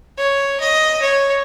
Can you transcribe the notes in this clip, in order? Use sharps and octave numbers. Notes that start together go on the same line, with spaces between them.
C#5
D#5
C#5